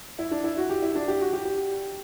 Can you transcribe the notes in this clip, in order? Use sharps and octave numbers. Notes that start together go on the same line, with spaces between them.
E4
D4
E4
F#4
G4
E4
D4
G4
F#4
G4
G4